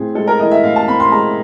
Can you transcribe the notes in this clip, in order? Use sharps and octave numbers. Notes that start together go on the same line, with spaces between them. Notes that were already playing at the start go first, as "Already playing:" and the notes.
Already playing: A2 C4 G#4
G#3 A4
A#4
E3 D#5
E5
A2 F5
A5
C4 B5
C6
G#3 A#5